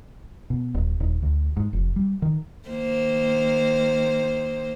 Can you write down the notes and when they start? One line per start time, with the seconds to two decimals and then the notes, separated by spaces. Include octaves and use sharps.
0.50 B2
0.74 D#1
1.00 D#1
1.22 D2
1.57 G#2
1.73 F1
1.96 G3
2.22 D#3
2.68 D#3 A#3 C5